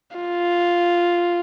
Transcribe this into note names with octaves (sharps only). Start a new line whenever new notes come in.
F4